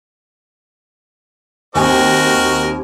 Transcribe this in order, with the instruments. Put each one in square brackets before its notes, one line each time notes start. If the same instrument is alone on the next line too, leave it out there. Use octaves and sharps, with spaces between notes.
[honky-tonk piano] D#2 G#5 [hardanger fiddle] C4 G5 [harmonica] F#4 A#4 D#5